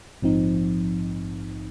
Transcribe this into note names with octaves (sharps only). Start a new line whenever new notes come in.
A#1 G#2 F3 C4 D#4